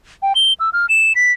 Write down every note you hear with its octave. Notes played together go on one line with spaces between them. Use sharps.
G5
G7
E6
F6
E7
B6